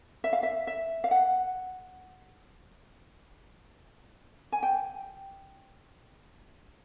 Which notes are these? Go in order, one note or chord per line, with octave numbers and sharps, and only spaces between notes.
E5
F5
E5
E5
F5
F#5
G#5
G5